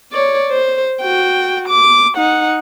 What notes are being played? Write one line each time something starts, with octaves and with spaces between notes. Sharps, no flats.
C#5 D5
C5
F#4 G5
D6
D#4 F#5